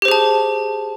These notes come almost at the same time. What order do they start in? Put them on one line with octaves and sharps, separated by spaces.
G4 C5 G#4 A5